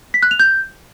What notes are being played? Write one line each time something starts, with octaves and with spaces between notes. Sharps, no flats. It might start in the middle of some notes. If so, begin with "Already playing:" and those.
B6
F#6
F7
G6